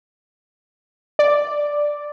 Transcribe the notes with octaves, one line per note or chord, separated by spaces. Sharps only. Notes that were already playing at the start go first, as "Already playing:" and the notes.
D5